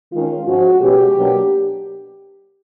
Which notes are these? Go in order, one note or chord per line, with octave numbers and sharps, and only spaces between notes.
D#3 G#3 C#4 F4
G#2 F3 G#3 C#4 F#4
B2 G#3 C#4 G4
B2 F#3 A#3 D4